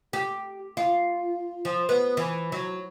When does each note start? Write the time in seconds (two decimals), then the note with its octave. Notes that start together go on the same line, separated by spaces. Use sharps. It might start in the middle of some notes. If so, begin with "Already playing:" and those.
0.13 G4
0.77 F4
1.65 F3
1.89 B3
2.17 E3
2.52 F#3